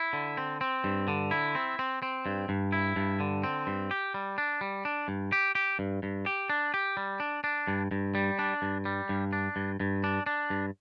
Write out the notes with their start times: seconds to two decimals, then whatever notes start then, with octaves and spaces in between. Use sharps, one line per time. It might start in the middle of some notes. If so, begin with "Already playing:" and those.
Already playing: E4
0.13 D3
0.37 C4
0.61 C4
0.84 G2
1.08 D3
1.31 E4
1.55 C4
1.79 C4
2.02 C4
2.26 G2
2.49 G2
2.72 E4
2.96 G2
3.20 D3
3.44 C4
3.67 G2
3.91 G4
4.14 G3
4.38 D4
4.61 G3
4.85 D4
5.08 G2
5.32 G4
5.55 G4
5.79 G2
6.03 G2
6.26 G4
6.50 D4
6.74 G4
6.97 G3
7.20 D4
7.44 D4
7.67 G2
7.91 G2
8.15 G3
8.39 D4
8.62 G2
8.85 G3
9.09 G2
9.33 D4
9.56 G2
9.80 G2
10.04 D4
10.26 D4
10.50 G2